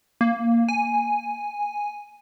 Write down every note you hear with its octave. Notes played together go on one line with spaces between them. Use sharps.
A#3
G#5